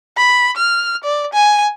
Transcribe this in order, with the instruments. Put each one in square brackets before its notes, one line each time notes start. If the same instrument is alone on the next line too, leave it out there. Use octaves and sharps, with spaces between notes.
[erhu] B5
F6
D5
G#5